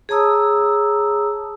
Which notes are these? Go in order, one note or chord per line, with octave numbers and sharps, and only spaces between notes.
G#4 C#5 A5 A#5 D#6 E6